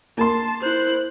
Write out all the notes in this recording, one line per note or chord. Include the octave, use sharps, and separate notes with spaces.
A#3 A5 C6
E4 C5 F#6